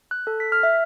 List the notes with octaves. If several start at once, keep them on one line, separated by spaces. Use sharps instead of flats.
F#6
A4
B6
F6
E5